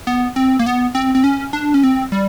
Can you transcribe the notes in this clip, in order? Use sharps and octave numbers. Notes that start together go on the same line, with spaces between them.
B3
C4
A#3
B3
C4
C4
C#4
D4
C#4
C4
G3